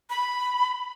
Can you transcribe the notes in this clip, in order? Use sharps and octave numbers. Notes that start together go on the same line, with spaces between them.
B5